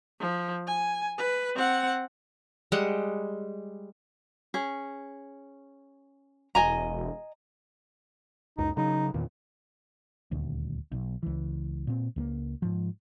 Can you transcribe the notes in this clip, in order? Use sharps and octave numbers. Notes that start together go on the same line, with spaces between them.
F3
G#5
B4
C4 F#5
G3 G#3 F#5
C#4 G#4
E1 D#5 G#5 A#5
C#2 F#2 D#4
C#3 F#3 D#4
E2 A#2 D#3
D#1 D2
B1
C#2 E3
A#2 C4
C#2 A3 A#3
G#2 F3